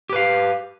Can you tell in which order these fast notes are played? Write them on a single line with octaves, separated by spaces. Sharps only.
G4 B4 F5